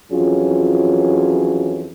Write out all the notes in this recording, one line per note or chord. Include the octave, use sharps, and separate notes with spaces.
F2 E3 F#3 C#4 F4 G#4